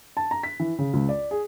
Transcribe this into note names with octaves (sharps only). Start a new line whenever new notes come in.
A5
A#5
B6
E3
C#3
C#2
D5
G#4